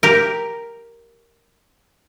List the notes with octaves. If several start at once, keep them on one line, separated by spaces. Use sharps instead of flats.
G4 A#4